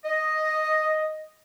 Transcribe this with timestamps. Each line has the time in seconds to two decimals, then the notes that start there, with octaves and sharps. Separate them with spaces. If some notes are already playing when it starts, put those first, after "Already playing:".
0.04 D#5